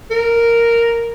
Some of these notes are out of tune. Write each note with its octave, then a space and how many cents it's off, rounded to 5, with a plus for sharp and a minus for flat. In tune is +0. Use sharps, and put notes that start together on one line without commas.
A#4 -5